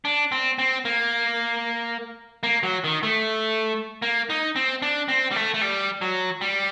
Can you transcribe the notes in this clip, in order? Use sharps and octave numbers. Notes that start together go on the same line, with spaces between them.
D4
C4
C4
A#3
A#3
F#3
D#3
A3
A#3
D#4
C4
D4
C4
G3
A3
A3
G3
F#3
G3